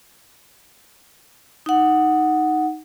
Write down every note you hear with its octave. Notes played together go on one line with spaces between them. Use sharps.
D#4 F#5